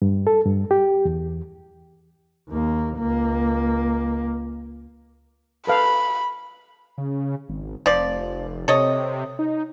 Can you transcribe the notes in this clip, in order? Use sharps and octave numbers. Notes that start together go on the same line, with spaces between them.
G2
A4
G2
G4
E2
D#2 A#3
C#2 A#3
A4 B4 F5 B5
C#3
G#1
F1 F3 D5
C3 A4 C#5 D#5
D#4